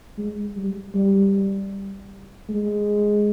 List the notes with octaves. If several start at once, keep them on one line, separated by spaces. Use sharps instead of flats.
G#3
G3
G3
G#3